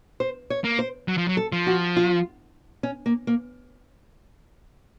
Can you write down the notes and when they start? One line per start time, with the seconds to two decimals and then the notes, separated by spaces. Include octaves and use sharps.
0.20 C5
0.50 C#5
0.64 A#3
0.79 C5
1.08 F#3
1.18 F3
1.28 F#3
1.37 A4
1.52 F3
1.67 F#4
1.96 F4
2.83 C#4
3.06 A#3
3.27 A#3